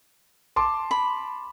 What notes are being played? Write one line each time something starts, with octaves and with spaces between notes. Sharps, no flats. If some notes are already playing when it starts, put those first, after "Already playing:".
A5 C6 D6
B5